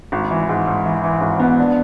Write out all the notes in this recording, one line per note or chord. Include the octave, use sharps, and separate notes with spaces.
G#1
E3
G#2
G#2
E3
E3
G#1
B3
D4